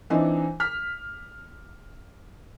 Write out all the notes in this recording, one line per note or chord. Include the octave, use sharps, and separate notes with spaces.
E3 C4 D4 D#4
F6 B6